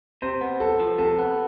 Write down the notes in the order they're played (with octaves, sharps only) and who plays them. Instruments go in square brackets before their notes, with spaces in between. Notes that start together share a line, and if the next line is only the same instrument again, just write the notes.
[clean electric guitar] C3 [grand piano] C5
[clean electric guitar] B3
[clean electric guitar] C2 [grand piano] A4
[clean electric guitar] F3
[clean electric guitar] C3 [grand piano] A4
[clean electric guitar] B3